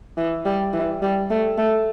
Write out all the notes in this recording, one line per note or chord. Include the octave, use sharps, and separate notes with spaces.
E3
G3
E3
G3
A3
A3